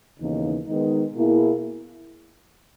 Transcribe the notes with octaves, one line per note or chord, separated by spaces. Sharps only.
D#2 C#3 E3 B3 D#4
D#3 G#3 B3 D#4
B2 A#3 E4 G#4